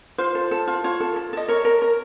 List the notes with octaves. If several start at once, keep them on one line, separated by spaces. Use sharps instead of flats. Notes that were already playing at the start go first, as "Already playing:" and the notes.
F4 C5
A4
A4
F4
F4 C#5
A4
A4
A4 D#5
A#4 C#5
A#4
A#4